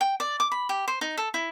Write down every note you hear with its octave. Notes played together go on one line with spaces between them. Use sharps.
G5
D5
D6
B5
G4
C5
D#4
A4
E4